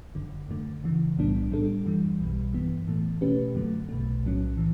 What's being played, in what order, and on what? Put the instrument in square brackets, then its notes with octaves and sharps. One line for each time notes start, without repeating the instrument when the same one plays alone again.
[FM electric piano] G1 F#2 D3
F#2 D3 A3
F#2 C#3 E3
B1 A2 G3 B3 D4
A2 G3 D4 A4
F#2 E3 G3
B1 B2 G3
G2 E3 B3
A2 E3 A3
B2 A3 C#4 G4 B4
F#2 D3 F#3 A3
B1 B2 A3
B1 A2 F#3 C#4
A2 E3